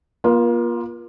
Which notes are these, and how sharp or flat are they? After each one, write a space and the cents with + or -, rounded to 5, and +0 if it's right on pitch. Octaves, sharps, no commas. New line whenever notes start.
A#3 +40 F4 +0